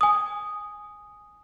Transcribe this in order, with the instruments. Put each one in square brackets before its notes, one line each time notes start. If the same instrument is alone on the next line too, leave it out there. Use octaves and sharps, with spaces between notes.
[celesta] G#5 D#6